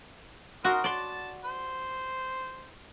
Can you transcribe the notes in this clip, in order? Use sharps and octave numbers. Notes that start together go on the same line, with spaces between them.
D#4 F#4 A#4 C6
D5 A5 C6
C5